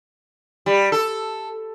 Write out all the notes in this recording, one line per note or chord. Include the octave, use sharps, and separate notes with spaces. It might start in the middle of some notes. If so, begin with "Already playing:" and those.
G3
A4